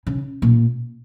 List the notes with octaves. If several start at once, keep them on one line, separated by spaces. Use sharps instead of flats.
C#3
A#2